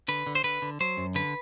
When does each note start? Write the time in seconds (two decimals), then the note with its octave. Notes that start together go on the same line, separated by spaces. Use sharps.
0.08 D3 B4
0.26 D3
0.35 C5
0.44 D3 B4
0.62 D3
0.80 F#3 C5
0.97 F#2
1.15 D3 B4